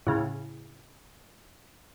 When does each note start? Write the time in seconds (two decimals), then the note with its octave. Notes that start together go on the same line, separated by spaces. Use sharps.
0.07 A2 C#3